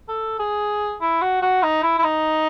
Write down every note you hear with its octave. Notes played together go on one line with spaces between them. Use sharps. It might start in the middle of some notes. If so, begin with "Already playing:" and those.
A4
G#4
E4
F#4
F#4
D#4
E4
E4
D#4